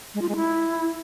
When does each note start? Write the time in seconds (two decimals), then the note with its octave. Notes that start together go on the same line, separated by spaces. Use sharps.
0.14 G#3
0.22 F4
0.29 G#3
0.36 E4